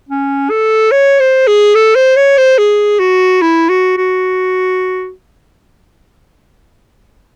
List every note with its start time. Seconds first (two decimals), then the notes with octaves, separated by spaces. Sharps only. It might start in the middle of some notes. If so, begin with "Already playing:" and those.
0.09 C#4
0.50 A4
0.92 C#5
1.20 C5
1.47 G#4
1.75 A4
1.95 C5
2.16 C#5
2.38 C5
2.58 G#4
2.99 F#4
3.41 E4
3.69 F#4
3.97 F#4